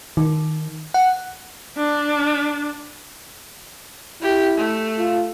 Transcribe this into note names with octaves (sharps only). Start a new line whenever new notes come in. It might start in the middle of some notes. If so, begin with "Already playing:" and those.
D#3
F#5
D4
E4 G4
A3
F4